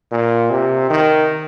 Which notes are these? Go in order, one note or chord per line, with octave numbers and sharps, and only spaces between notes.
A#2
C3
D#3